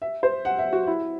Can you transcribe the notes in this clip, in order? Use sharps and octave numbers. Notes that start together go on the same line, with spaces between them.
E5
C5
F#5
E5
F#4
E4